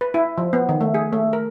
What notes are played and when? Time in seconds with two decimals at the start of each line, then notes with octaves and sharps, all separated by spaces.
0.01 B4
0.14 E4
0.38 F3
0.53 B3
0.69 D#3
0.81 A3
0.94 G#4
1.13 A3
1.33 A#4